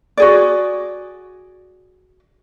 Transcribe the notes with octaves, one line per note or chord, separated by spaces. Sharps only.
F#4 G#4 D5